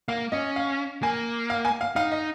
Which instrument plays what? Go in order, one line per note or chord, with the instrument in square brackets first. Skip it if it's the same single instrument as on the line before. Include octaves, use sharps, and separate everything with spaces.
[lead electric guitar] A#3 [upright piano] F5
[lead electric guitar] C#4 [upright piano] D#5
[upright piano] F5
[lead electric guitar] A#3 [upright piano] G#5
[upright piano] F5
G#5
F5
[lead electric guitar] D#4 [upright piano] F5
[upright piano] D#5